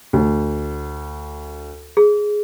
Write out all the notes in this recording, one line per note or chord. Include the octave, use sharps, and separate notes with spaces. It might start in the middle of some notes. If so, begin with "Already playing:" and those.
D2
G#4